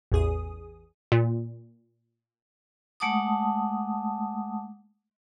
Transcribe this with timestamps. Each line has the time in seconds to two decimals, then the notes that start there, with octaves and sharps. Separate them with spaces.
0.12 A1 E2 G#4 D#6
1.12 A#2
3.00 G#3 A3 F#5 A5 D6 D#6